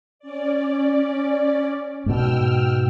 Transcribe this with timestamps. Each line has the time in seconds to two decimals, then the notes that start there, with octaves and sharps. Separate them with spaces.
0.19 C#4 D5
2.06 G#2 B2 G5 E6 F6